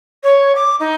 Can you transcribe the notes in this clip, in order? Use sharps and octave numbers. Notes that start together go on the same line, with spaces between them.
C#5
D6
D#4